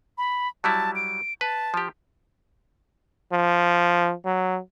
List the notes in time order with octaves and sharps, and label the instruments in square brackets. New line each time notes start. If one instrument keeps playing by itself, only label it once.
[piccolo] B5
[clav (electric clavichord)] F#3 G3 E4 [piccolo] A5
[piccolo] D7
[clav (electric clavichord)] B4 [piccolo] A5
[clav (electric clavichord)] F3 G4
[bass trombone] F3
F#3